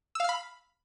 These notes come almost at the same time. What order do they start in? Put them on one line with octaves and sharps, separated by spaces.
E6 F5 F6 B5